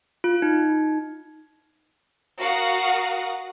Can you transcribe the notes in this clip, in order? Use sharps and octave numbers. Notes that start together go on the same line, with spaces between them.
F4
D#4
F#4 A#4 F5 F#5 D#6